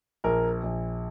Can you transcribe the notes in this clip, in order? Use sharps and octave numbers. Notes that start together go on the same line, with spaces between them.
A#1 A#4
A#1